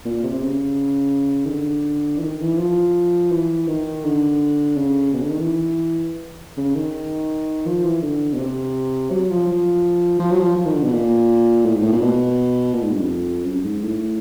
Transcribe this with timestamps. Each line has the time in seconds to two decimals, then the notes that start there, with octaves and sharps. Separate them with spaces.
0.05 A#2
0.23 C3
0.34 C3
0.42 C#3
1.46 D#3
1.50 D3
2.18 E3
2.22 D#3
2.41 E3
2.59 F3
3.32 E3
3.68 D#3
4.04 D3
4.77 C#3
5.13 B2
5.22 D3
5.30 D#3
5.40 E3
6.57 C#3
6.75 D#3
7.66 F3
7.84 E3
8.02 D3
8.33 B2
8.38 C3
9.11 F#3
9.30 F3
9.47 F3
10.19 F3
10.31 F#3
10.40 F3
10.56 F3
10.66 D#3
10.74 D3
10.84 B2
10.93 A#2
11.65 A2
11.74 G#2
11.82 A2
11.92 A#2
12.01 B2
12.73 A#2
12.83 G#2
12.92 G2
13.00 F2
13.45 F#2
13.64 G#2
13.82 A2